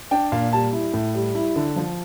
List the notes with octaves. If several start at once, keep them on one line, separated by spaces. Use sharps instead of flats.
D4 G5
A#2 F5
G3 A5
E4
A2
G3
E4
D3
F3